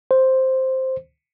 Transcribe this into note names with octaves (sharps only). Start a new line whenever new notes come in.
C5